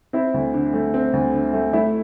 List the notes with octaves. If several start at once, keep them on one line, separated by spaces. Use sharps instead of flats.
C4 E4
D2
D3
A3
C4
D2
D3
A3
A3 E4